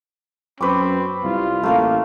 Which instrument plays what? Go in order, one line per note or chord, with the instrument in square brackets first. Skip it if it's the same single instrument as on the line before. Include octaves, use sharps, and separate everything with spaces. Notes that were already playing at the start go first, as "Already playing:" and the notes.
[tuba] F#2 [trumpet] C4 [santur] B4 C#6 D6
[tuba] C2 [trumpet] F4
[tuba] A1 [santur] A3 A#3 A#4